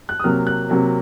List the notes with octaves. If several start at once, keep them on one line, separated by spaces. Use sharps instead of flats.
F#6
D#6
C3 F#3 A#3 F6
F#6
C3 F#3 A#3